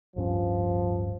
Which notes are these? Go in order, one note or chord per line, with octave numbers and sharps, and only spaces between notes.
D1 G2 F3 C#4